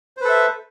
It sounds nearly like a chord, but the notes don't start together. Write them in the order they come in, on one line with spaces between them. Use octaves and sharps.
C5 B4 A4 E5